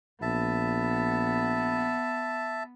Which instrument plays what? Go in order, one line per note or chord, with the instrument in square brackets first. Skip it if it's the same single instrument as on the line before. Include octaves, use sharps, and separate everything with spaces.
[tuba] A#1 [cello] B3 [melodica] E5 A5